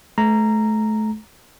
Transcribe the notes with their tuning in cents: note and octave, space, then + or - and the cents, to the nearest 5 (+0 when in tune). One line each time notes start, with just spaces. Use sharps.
A3 -30 A#5 -5